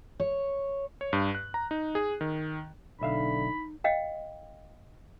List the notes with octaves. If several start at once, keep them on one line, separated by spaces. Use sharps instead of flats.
C#5
C#5
G2
F#6
A#5
D#4
G#4
D#3
B1 D3 D#4 E5 F5 B5
D#5 F5 G5